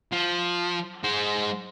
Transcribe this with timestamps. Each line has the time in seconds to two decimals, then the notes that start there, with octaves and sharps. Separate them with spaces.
0.12 F3
1.04 G#3 C5